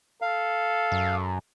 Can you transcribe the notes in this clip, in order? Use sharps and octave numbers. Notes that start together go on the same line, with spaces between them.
A4 F5
F#2